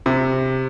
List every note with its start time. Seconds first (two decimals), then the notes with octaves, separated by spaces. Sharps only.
0.06 C3